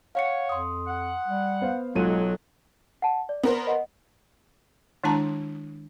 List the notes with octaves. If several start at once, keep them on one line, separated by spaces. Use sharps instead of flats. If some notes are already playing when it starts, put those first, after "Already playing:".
C#5 F5 F#5 C#7
F2 C6 D#6
F#5
G3
B3 C5 F5
B1 F#3 G#3 F4 A4 D#7
F#5 A5
D5
B3 A#4 C5
D#5 F#5
D#3 G#3 D4 E4 A5 A#5